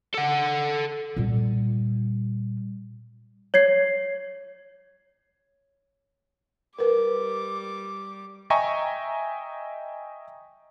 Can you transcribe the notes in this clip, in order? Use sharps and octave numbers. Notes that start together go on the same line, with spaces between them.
A4 F#5
A#2 G3
C#5 G#6 C7
G3 A#4 B4 D6
D#5 E5 G5 G#5 A#5 C#6